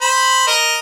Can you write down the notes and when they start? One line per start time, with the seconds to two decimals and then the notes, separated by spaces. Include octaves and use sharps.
0.02 C5 B5
0.47 A#4 D#5